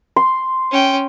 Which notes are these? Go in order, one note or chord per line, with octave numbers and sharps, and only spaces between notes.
C6
C#4 G5